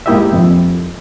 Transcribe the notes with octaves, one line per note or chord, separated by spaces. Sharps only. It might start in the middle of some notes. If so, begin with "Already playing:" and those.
G#2 A#3 E4 G4 D#5 E5
F2